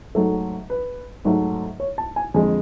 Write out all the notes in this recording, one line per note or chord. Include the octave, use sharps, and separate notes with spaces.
G#2 F#3 A3 A4
B4
G#2 F#3 A3
C#5
A5
G#5
F2 D3 G#3 G#5